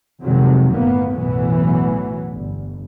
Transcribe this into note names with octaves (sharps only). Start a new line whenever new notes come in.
F2 C3 D#3 F#3 G#3
G1 A2 A#3 B3
B1 F#2 A2 E3 F#3 B3
G1